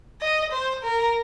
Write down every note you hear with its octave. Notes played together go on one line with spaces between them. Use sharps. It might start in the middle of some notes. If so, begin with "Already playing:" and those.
D#5
C5
A#4